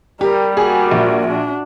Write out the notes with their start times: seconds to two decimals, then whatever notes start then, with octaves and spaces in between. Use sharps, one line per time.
0.21 G3 G4 A#4
0.57 A#3 F#4 G#4
0.91 A#1
1.27 D4 F#4